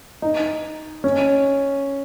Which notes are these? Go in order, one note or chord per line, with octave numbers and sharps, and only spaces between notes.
D#4
C#4